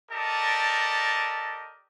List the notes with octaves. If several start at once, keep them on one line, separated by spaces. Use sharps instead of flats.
G4 A4 A#4 D5 D#5 A5